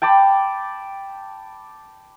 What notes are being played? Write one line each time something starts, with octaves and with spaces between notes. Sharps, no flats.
G5 A5 B5 D6